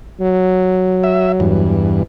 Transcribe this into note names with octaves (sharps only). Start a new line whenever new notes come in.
F#3
E5
E2 G2